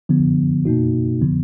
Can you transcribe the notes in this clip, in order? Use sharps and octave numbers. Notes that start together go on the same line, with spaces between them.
D3 F3 B3
B2 A#3 D#4 F#4
D3 F3 B3